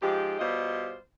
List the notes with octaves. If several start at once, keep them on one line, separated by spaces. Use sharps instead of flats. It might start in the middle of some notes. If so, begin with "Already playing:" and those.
G#2 F3 G#3 G4
B2 G3 F4 C5 D#5